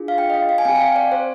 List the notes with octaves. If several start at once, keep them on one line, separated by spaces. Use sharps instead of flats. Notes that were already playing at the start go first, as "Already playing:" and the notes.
Already playing: D4 F4 G#4
F5
G5
D#5
F5
F5
G#5
C4 G4 G5
G5
F5
D5
C5